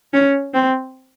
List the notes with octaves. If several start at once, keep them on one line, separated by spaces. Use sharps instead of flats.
C#4
C4